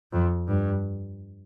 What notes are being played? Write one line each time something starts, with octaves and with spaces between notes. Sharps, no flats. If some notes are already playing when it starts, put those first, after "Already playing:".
F2
G2